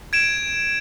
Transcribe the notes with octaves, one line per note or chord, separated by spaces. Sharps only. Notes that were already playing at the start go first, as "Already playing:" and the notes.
G#6 D7 E7